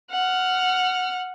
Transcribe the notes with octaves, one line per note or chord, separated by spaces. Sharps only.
F#5 F6